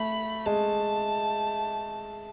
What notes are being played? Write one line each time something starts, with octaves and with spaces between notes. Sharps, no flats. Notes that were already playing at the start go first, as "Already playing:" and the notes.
Already playing: A3 B5
G#3 A5